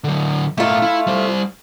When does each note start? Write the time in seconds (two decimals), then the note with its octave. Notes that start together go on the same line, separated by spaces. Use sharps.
0.04 D3 F#3
0.58 A2 A3 A#3 F4
0.82 E4 E5
1.07 G3 C5